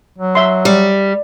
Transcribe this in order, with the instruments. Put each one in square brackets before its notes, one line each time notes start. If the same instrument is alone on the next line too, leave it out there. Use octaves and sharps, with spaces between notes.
[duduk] F#3
[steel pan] E5 C6
[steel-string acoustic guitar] G3